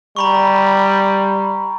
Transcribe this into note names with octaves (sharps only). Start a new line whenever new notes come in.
G3 A#5 B5 C#6